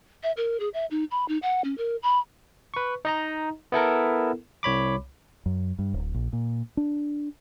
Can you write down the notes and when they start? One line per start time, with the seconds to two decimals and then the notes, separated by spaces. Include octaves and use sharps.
0.23 E5
0.37 A#4
0.60 G#4
0.74 E5
0.91 D#4
1.11 B5
1.28 D#4
1.42 F#5
1.64 C#4
1.78 A#4
2.03 B5
2.74 B4 C#6
3.05 D#4 D#5 A#5
3.72 B3 E4 A4 A#4
4.63 C2 C#5 B5 D6
5.46 F#2
5.79 G2
5.94 D1
6.14 A#1
6.33 A#2
6.77 D4